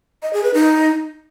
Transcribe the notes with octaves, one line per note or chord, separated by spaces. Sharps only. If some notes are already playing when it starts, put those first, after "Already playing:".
D#5
G#4
B4
D#4